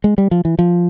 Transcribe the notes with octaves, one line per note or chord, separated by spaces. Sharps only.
G#3
G3
F3
E3
F3